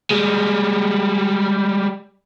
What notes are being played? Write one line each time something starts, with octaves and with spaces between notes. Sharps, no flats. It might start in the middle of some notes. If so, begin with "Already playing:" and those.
G3 G#3